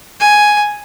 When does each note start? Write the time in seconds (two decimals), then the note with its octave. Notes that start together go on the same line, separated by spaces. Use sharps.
0.20 G#5